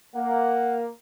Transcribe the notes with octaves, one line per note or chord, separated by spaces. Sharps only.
A#3 F#5